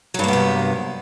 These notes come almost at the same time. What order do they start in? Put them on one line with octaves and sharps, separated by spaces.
F#3 G2 A#3 B3 C3